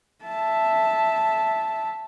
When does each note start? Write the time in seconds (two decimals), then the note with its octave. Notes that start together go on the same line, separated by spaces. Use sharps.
0.24 E5 A5